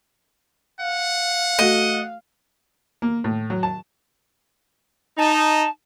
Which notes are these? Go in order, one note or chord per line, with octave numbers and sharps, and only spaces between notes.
F5 F#5
A3 F#4 D#5
A#3
A2
F#3
A5
D#4 A5